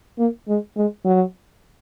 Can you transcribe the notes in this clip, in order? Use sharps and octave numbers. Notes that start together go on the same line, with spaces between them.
A#3
G#3
G#3
F#3